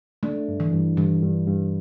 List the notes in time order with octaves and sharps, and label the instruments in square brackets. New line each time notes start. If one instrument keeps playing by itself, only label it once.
[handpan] A3 [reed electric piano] D4
[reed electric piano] G2
[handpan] E3
[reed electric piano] G2
[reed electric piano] G2 [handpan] E3
[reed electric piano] G2
G2